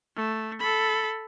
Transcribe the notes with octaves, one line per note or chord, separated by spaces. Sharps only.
A3
A4 B5